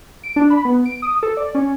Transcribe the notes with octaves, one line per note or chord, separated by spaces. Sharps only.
D7
D4
B5
B3
D7
D#6
A4
D5
C#4